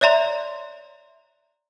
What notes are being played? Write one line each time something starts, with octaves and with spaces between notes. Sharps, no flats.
C#5 D5 E5 A#5 C6